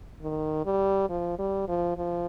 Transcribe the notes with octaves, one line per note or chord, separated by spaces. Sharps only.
D#3
G3
F3
G3
F3
F3